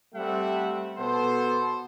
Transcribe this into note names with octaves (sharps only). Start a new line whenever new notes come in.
G3 A3 C4 E5 F#5
B2 B3 A4 C5